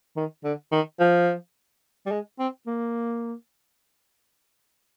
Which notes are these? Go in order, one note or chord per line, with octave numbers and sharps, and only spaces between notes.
D#3
D3
D#3
F3
G3
G#3
C4
A#3